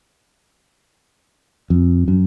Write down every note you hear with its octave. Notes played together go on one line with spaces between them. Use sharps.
F2
F#2